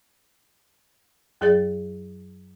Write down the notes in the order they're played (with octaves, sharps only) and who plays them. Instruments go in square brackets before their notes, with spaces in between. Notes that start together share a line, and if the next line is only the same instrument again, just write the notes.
[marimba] F#2 F#3 G#4 D5 A6